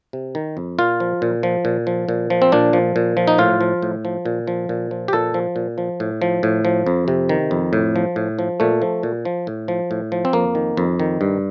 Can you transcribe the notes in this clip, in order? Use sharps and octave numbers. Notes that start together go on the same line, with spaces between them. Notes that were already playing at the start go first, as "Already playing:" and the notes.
C3
D#3
F2
A#2 F4
F3
A#2
F3
A#2
F3
A#2
F3
C4
A#2 D4
F3
A#2
F3
D#4
A2 F4
F3
A2
F3
A#2
F3
A#2
F3
G4
A#2 A4
F3
A#2
F3
A2
F3
A2
F3
F2
C3
D#3
F2
A2
F3
A2
F3
A#2 A3
F3
A#2
F3
A2
F3
A2
F3
C4
F2 A#3
D#3
F2
D#3
G2